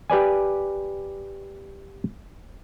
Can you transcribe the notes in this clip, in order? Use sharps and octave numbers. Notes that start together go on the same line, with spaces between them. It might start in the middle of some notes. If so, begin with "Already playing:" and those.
G4 B4 D5 G#5